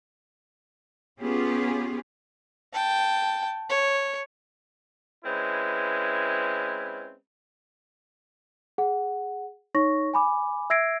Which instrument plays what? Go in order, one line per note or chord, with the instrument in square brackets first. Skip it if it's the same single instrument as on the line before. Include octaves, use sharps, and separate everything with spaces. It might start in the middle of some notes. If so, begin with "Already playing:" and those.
[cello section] B3 C#4 F4 G4 G#4
[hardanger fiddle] G5 A5
C#5
[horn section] G#3 C4 C#4 E4 B4
[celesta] G#4 F#5
D#4 C#5 C#6 A#6
G#5 B5 D6
E5 E6 G#6 A#6 C7 D7